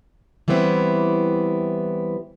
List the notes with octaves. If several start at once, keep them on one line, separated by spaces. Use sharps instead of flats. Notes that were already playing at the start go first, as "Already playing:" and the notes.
E3 G3 B3 C4 E4